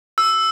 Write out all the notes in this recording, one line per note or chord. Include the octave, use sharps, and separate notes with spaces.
E6